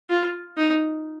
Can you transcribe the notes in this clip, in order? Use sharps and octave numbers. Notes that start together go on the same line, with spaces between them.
F4
D#4